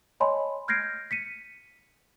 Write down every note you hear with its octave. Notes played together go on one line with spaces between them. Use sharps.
C#5 D#5 G#5 A5 B5 C6
F6 G6 G#6 A#6 C7 D7
B6 C#7 D#7